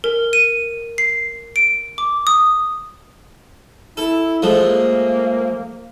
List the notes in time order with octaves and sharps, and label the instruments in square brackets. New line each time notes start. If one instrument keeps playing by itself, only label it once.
[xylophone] A#4
D#7
C7
D7
D6
D#6
[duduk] E4 [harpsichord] A4
[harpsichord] F3 G#3 A3 [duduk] A4
[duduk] A#3